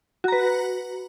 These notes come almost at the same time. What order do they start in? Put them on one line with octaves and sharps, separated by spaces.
F#4 A#5 B4